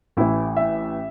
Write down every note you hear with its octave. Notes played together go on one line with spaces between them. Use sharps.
A1 A2 E3 E4
E5